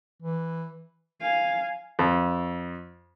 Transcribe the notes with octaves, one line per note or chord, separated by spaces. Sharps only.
E3
F5 G#5
F2